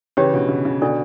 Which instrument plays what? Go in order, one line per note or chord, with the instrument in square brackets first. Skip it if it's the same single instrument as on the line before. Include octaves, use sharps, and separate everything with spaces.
[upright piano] C#3 E3 [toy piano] G4 C#5 G5
[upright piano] B2 D3
C#3
C#3
[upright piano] B2 D3 [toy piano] D4 A4 D5